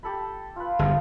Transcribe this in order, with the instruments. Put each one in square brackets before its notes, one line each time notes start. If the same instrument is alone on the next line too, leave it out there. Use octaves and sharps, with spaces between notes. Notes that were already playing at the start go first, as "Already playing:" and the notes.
[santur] G4 A4 B5
F4 B4
[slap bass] G1 E2 [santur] A4 C5 F5